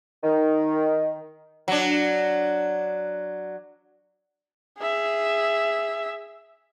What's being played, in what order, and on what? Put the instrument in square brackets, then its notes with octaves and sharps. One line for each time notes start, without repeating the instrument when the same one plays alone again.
[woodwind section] D#3
[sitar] F#3 D4
[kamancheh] G#4 E5